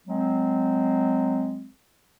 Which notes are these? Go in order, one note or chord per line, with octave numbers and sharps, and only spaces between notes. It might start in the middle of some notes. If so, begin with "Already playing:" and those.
F#3 G#3 C4